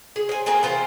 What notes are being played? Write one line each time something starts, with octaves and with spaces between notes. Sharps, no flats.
G#4
C5 G#5
A#3 C4 G#4 G#5
E3 F4 C5